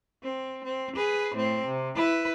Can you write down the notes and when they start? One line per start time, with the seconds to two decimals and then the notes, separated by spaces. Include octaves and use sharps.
0.23 C4
0.64 C4
0.96 G#4 B4
1.35 A2 C4
1.66 C3
1.95 E4 B4